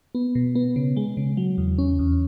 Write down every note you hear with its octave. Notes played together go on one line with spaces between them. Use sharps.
B3
B2
B3
C#3
G#3
C#3
F#3
E2
C#4
E2